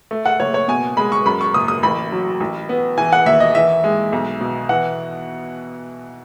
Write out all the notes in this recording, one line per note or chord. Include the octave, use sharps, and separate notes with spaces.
A3
F#5
F#1 C#5
C#5
B2 G#5
G#3 B5
C#6
F#2 B5
C#6
F#1 D#6
D#6
A1 B5
F#3
A1
B3
E3 G#5
F#5
D#2 E5
D#5
E3 E5
G#3
B1
B2
E3 F#5